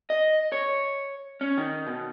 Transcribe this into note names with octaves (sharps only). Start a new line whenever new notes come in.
D#5
C#5
C#4
D#3
B2